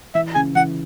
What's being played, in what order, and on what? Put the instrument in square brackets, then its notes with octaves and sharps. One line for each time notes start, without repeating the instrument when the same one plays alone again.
[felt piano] E3 [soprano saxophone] E5
[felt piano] C#3 [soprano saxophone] G#5
[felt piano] E3 [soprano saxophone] F#5